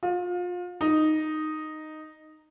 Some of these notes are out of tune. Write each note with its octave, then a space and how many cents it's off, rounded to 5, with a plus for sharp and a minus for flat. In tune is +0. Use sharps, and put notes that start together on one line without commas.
F4 +30
D#4 -5